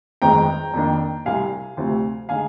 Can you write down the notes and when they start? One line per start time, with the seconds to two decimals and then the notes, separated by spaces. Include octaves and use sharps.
0.22 G1 F2 D#3 G#3 C4 G5 A#5
0.73 F2 D#3 A#3 D4
1.25 C2 C3 G3 F5 G#5
1.77 D2 C3 F3 C4
2.29 D3 G#3 D#4 F5 G#5